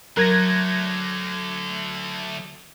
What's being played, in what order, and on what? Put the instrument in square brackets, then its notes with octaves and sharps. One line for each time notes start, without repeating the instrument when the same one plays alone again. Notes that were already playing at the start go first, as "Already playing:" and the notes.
[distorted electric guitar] D3 A3 [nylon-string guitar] F#3 [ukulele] A#4 [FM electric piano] F#6 G#6 A#6